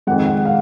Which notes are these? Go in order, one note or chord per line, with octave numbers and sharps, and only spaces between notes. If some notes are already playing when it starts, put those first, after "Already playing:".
F2 D#3 G#3 F#5
F#5
F5